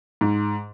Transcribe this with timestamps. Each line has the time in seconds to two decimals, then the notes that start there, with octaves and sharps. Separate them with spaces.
0.21 G#2